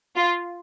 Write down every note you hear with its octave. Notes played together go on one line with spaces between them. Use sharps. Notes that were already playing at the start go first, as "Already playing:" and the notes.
F4